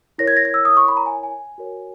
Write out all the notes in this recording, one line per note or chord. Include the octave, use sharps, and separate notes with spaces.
E4 A#4 C#5 A#6
G#6
A#6
G#6
E6
D#6
C#6
B5
A#5
G#5
G#5
F#4 A#4 C#5